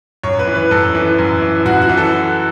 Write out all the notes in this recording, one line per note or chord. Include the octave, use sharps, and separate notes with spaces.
F#2 C#5
B4
E3
B4
F#2 A4
E3
F#2
E3
F#2 F#4
F#4
E3
A4